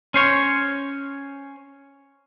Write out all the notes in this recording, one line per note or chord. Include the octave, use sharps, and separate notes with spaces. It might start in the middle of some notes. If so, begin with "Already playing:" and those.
C#4 C5 C#5